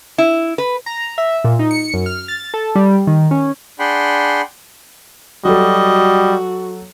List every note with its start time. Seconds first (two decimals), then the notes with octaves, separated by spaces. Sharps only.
0.18 E4
0.58 B4
0.86 A#5
1.18 E5
1.44 A#2
1.59 D#4
1.71 C#7
1.94 F#2
2.06 F6
2.28 A6
2.54 A4
2.75 G3
3.07 D#3
3.31 C#4
3.79 D4 G#4 F#5 G5 B5 C6
5.45 F#3 G3 F#4 A4 D#5